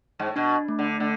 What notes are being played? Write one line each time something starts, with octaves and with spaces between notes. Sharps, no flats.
G#2
A2
B2 D4
A3
D3
D3 A3